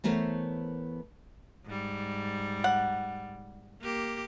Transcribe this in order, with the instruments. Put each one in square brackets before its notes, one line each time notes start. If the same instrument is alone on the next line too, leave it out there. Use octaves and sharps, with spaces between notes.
[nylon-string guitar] E3 A3 B3 A#4 C5 C#5
[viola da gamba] G#2 G3
[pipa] F#5
[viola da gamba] A#3 G4